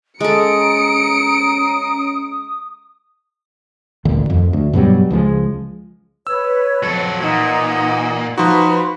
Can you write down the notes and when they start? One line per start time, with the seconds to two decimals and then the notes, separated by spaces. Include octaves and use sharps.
0.20 G#3 C#4 A4 A#5 D#6 C#7 D7
4.05 D#1 G#1 D2 D#3
4.30 F2
4.53 D2
4.73 G2 B2 F#3 G3
5.10 C#2 F3 F#3 G#3
6.27 B4 C#5 E6
6.83 F3 F#3 A4
7.20 A#2 E3 D#4 F#5
8.38 F3 D#4 F#4 B4 B5 C6